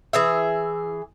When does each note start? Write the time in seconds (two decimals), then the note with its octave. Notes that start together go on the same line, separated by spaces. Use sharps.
0.13 E3 G#4 E5